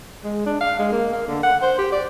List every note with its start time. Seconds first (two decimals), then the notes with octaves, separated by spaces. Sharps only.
0.24 G#3
0.46 D4
0.61 F5
0.79 G#3
0.92 A#3
1.13 A#3
1.27 D3
1.43 F#5
1.62 C5
1.79 G4
1.92 D5